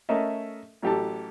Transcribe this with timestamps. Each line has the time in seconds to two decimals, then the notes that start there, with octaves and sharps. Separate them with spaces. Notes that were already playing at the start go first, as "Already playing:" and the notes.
0.09 A3 C#4 A4 A#4 D#5 E5
0.82 A1 F#3 G4 A4 A5